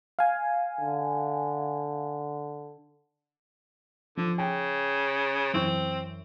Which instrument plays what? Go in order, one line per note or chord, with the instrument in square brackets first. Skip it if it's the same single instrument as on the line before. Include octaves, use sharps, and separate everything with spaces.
[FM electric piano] F5 G#5
[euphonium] D3
[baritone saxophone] D3 [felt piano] F3
[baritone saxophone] C#3 [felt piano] G5
[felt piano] F#2 E3 C#6 [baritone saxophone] C4